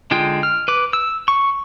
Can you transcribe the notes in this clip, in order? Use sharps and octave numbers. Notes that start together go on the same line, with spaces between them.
D3 G#3 F4 G5
F6
B4 D6
E6
C#6